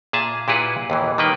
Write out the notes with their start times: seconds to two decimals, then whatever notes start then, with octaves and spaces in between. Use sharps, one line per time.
0.13 A#2 G#4 E5 A5
0.48 A#2 E4 G4 G#4 B4 F#5
0.90 D#2 A#2 E3
1.18 D#3 G3 A#3 B4 G5